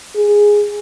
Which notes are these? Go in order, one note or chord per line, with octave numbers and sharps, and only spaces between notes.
G#4